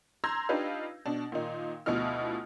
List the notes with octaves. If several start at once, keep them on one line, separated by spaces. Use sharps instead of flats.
A#5 C6 E6 G6 G#6 A#6
D4 D#4 F4 G4 B4 F5
B2 D4
A#2 D#3 D#4
D2 B2 F3 E4 D#5 F6